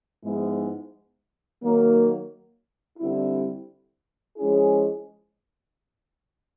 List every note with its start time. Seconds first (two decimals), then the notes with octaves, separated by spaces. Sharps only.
0.24 G#2 F3 G#3 B3 E4
1.61 D#3 F#3 A#3
2.99 D3 G3 C4 E4
4.36 F3 G#3 C#4 E4 G#4